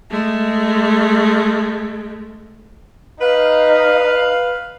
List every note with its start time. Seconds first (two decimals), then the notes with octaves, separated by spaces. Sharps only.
0.10 G#3 A3
3.21 D#4 B4 F5